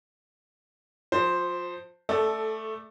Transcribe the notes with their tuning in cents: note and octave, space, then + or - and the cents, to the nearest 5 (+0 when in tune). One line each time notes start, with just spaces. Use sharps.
F3 +30 C5 +0
A3 +0 A4 -15 D5 +15